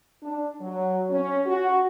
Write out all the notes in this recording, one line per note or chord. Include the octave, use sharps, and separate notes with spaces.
D4
F#3
C#4
F#4